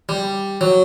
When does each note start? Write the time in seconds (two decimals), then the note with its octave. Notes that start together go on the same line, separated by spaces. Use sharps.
0.09 G3
0.61 F#3